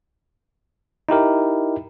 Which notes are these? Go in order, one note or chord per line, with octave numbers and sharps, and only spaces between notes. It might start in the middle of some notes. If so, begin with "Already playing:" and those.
D#4 E4 G4 A#4